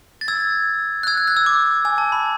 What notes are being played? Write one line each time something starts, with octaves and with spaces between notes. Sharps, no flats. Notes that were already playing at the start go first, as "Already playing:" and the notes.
A6
E6 G#6
F#6
E6 G#6
F#6
F#6
E6
D6
G#5
A5
B5